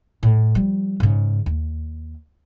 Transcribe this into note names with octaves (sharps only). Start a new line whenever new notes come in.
A2
F3 G3
G#2 C#3
D#2